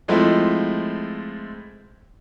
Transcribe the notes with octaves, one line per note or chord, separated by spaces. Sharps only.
F3 G#3 A3 C4 E4